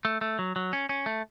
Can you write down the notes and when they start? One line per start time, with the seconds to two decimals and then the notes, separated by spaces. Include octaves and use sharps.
0.05 A3
0.21 A3
0.39 F#3
0.56 F#3
0.73 C#4
0.89 C#4
1.06 A3